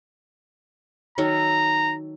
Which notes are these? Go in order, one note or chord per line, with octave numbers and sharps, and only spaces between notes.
D#3 F#3 A4 A#5